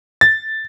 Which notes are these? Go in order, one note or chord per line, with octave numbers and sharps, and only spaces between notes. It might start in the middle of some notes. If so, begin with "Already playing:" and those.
A6